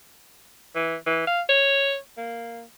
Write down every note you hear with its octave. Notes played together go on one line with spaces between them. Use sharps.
E3
E3
F5
C#5
A#3